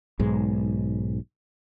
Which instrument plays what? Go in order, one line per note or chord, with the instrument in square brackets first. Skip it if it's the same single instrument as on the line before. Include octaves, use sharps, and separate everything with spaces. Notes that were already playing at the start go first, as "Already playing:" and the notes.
[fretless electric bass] B1 G#2 G#3